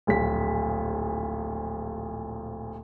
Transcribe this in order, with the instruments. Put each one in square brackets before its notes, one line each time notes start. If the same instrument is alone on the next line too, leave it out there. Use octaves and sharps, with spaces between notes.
[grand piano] D1 A#1 B6